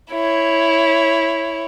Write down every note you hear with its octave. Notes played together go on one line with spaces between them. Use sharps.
E4 C#5